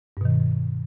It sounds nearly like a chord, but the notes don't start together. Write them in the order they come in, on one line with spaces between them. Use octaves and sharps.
G2 B2 D#3